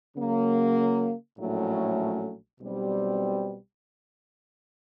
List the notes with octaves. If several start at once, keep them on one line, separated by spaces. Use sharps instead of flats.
C#3 F#3 A#3
A#1 A2 F#3 A3 C#4
B1 B2 G3 C4